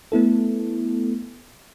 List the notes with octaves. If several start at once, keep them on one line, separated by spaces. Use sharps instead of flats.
A3 B3 E4 A4